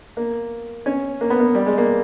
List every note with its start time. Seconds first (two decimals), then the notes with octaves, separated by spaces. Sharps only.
0.17 A#3
0.86 C#4
1.21 A#3
1.30 B3
1.40 A#3
1.55 G3
1.66 G#3
1.78 A#3